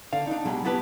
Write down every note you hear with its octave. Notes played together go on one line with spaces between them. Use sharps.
D3 F5
D4 D#4
B2 F#3 G#3 G4 B5
B3 E4 G4 B4 A5